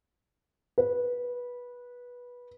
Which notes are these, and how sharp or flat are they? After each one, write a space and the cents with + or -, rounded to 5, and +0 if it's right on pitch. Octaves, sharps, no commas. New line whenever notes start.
B4 -15